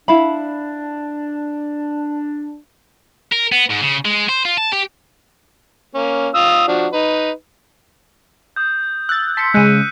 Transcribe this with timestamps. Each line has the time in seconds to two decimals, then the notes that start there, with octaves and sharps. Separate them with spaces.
0.08 D4 E4 F5 B5
3.32 A#4
3.52 B3
3.70 G#2
3.83 C#3
4.05 G#3
4.29 C5
4.45 F4
4.58 A5
4.73 G4
5.95 A#3 C#4
6.34 F4 D#6 E6
6.68 F3 D4 F#4
6.92 D#4 B4
8.56 D#6 G6
9.09 E6 F#6 A6
9.37 A5 C6 B6 C#7
9.54 C#3 G#3 F#6 C#7 D#7